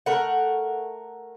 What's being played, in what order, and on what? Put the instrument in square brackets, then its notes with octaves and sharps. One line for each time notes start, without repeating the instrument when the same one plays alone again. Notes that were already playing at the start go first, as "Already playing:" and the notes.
[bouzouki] A3 A#4 F#5